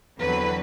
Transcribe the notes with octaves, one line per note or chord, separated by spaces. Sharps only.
E2 D3 F#3 C4 B4